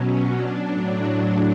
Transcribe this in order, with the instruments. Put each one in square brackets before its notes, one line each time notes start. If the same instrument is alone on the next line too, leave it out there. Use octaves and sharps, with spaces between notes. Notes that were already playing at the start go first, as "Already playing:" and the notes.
Already playing: [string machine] B2 F#3 C#4
D4
A2 F#3